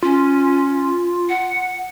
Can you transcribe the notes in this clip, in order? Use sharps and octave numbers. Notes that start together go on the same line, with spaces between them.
C#4 F4
F#5